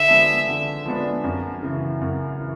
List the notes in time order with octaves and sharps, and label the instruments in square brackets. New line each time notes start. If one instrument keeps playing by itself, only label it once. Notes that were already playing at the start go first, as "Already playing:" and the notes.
Already playing: [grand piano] D3 [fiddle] E5
[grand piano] F3 G#3 B3 D4
D3
F3 G#3 B3 D4
F#2
C#3 E3
F#2
E3